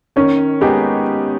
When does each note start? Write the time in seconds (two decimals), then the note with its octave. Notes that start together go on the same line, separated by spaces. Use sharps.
0.16 D#3 C#4
0.61 G#3 B3 D#4 G4 G#4